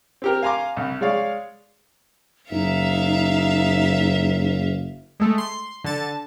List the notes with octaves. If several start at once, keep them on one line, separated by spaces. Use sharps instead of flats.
C4 G4 A#4
F5 G#5 A#5 C6 D6
C2
G#3 C#5 D5 F5
F#1 D#4 E5 F5
G#3 A3
C6
D3 A5